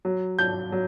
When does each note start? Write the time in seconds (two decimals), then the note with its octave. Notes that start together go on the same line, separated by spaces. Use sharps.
0.05 F#3
0.38 F#3 G6
0.72 F#3